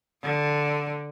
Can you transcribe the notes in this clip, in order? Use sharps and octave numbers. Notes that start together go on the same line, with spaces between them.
D3